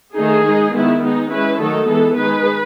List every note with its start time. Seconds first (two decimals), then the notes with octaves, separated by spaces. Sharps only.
0.15 D#3 A3 D#4 G#4
0.45 G#3 D#4
0.73 D#3 G#3 B3 E4
1.02 G#3 B3 D#4
1.31 G#3 C#4 E4 B4
1.60 D#3 F#3 A3 D#4 A4
1.89 E3 G#3 B3 A4
2.17 D#3 G#3 D#4 B4